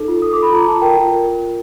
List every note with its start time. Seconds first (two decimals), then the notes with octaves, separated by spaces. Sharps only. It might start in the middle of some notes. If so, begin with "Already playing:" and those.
Already playing: D#4 A4
0.08 F4
0.22 A4 D#6
0.33 D6
0.37 A4 B5
0.52 F4 A#5
0.67 F4 A5
0.81 A#4 G5
0.97 F4
1.12 A#4